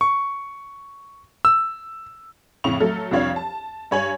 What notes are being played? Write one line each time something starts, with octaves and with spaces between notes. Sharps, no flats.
C#6
E6
F2 A2 C#3 C#6 F7
F#3 A3 A4 F6
C2 F2 F3 D4 C#5 F5
A5
G2 C#5 G#5 F#7